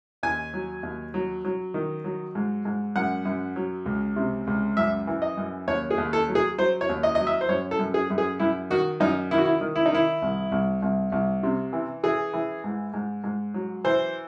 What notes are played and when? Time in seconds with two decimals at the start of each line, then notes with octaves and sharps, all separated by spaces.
0.23 D#2 G#5
0.54 F#3
0.83 D#2
1.14 F#3
1.45 F#3
1.74 D#3
2.04 F#3
2.35 G#2
2.65 G#2
2.96 F#2 F#5
3.25 F#2
3.56 F#3
3.86 C#2
4.16 C3
4.47 C#2
4.77 F#2 E5
5.07 E3
5.22 D#5
5.37 F#2
5.68 D#2 C#5
5.91 G#4
5.98 D#2
6.13 A4
6.28 F#3
6.35 G#4
6.58 F#3 C5
6.81 C#5
6.89 D#2
7.03 D#5
7.15 F#3 D#5
7.27 E5
7.41 C5
7.49 F#2 C#5
7.71 A4
7.79 F#2
7.94 G#4
8.10 F#2
8.18 G#4
8.39 F#2 E4
8.70 D#3 F#4
9.00 F#2 D#4
9.31 D#3 E4
9.37 F#4
9.45 E4
9.61 D#3
9.76 E4
9.86 D#4
9.91 D#3 E4
10.22 C2
10.52 C2
10.82 C2
11.12 C2
11.43 C3
11.73 E3
12.03 E3 G#4
12.33 E3
12.64 G#2
12.94 G#2
13.24 G#2
13.54 F#3
13.84 E3 C5